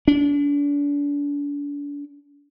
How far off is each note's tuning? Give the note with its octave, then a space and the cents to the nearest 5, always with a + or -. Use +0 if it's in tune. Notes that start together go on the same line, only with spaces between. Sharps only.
D4 -35